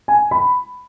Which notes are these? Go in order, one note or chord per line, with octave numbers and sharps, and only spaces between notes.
G#5
B5